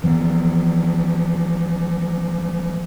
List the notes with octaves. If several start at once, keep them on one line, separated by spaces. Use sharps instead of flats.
E3 F3 B3